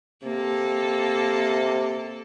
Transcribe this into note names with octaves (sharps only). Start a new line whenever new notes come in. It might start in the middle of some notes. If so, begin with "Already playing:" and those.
C3 A#3 A4